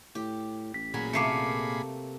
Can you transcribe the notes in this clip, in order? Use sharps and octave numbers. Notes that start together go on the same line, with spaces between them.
A2 G4
A1 B6
A#2 F#3 G#4 B5
C3 A3 A#3 D6 C7 C#7